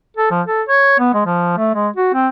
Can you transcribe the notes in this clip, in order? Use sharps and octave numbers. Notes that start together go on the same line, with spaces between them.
A4
F3
A4
C#5
B3
G#3
F3
A3
G#3
F#4
C4